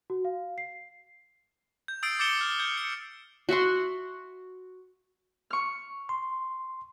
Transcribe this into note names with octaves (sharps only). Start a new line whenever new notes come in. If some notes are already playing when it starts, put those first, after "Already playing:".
F#4
F5
C7
G6
D#6 E6 G6 A6 C7 D7
D6 G6 A6 C#7 E7 G7
F6
F6 G6
C#7
F#4 E5 F#5 C6
C#6 F6
C6